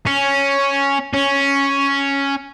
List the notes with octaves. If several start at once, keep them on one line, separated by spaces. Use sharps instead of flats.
C#4
C#4